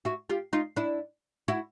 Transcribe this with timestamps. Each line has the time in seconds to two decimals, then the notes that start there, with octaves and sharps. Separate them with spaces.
0.05 E4 F#4
0.30 F4 G4
0.53 D#4 F4
0.76 D4 E4
1.48 E4 F#4